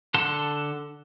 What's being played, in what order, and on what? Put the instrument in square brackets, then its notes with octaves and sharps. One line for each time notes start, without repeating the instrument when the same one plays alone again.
[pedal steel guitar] D3 A4 F#5 A5 C6